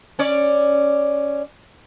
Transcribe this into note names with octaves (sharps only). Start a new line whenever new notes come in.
C#4 C#5 D5